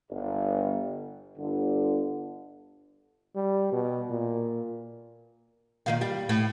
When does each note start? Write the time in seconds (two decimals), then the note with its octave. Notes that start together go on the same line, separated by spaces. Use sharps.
0.11 G1
1.37 G1 D3
3.35 G3
3.72 B2
4.10 A#2
5.86 A#2 D#3 F5
6.01 G3
6.29 A2